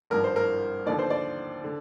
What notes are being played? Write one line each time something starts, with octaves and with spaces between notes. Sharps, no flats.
G#1 G2 F3 A#4
C5
A#4
D#2 D3 F3 D5
C5
D5
D3